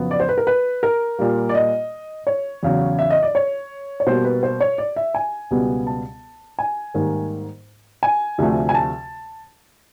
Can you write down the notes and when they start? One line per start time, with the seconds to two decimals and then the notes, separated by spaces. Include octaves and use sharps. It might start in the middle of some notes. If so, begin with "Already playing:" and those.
Already playing: F2 C#3 F#3 B3
0.11 D5
0.20 C5
0.29 B4
0.38 A#4
0.47 B4
0.83 A#4
1.19 A#2 G3 A#3
1.49 D5
1.55 D#5
2.27 C#5
2.63 E2 C#3 F#3
2.99 E5
3.10 D#5
3.23 D5
3.35 C#5
4.00 C#5
4.07 B2 G3 A#3 C5
4.25 B4
4.43 C5
4.61 C#5
4.78 D5
4.96 E5
5.15 G#5
5.51 C#2 B2 G3 B3
5.87 A5
6.59 G#5
6.94 G#2 D#3 G3 A#3
8.03 G#5
8.38 D2 C3 F3 A3
8.69 G#5
8.74 A5